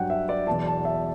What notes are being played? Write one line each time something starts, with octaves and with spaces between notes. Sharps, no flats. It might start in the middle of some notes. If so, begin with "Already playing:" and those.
Already playing: G2 F#3 F#5 G5
E5
D5
E2 B2 F#3 A5
A5
E5